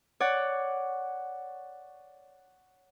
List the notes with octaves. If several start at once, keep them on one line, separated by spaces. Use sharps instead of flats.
C#5 D5 F#5